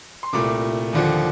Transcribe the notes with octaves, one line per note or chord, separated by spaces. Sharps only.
C6
C2 A#2 A3 D6
D#2 D3 F3